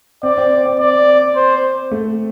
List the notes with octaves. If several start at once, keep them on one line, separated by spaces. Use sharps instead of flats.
C4 D5
C4
C4
D5
C5
A3